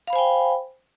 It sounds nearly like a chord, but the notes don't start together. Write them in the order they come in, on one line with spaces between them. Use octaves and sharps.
F5 B5 C5 G#5 G5